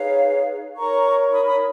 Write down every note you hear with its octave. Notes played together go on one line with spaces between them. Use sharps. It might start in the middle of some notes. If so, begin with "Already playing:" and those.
Already playing: D#4 G#4 B4 C#5 F5
D#4 A#4 C#5 A#5 C#6
B5 D#6
B5 D#6